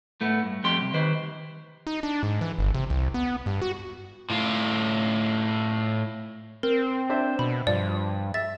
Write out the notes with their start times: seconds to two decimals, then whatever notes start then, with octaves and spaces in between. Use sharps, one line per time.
0.21 A2 A3 B3
0.44 G2
0.64 F2 A3 G4 C6
0.77 C2 F#2
0.94 D#3 G4 B4 C5
1.87 D#4
2.03 D4
2.23 G#2
2.41 E3
2.59 G1
2.75 C3
2.90 C2
3.14 B3
3.46 G2
3.61 F#4
4.30 A2 F4
6.63 C4 A#4
7.10 D4 C5 E5
7.39 B2 B5
7.67 G2 F3 D5
8.34 E5 A6